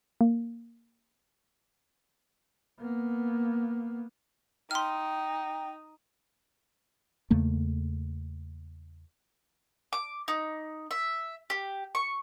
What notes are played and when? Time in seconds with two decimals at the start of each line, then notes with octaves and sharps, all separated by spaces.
0.21 A#3
2.78 A#3 B3
4.71 D#4 G5 C6 F6
7.30 E2 C#3 A3 A#3
9.93 D6
10.28 D#4
10.91 E5
11.50 G4
11.95 C#6